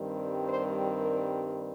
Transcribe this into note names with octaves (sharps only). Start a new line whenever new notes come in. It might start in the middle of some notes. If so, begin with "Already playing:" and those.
Already playing: G2 D#3 G3 C4
C5
A#4